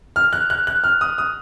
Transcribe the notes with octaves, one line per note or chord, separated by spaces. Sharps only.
F6
F#6
F#6
F#6
F6
D#6
D#6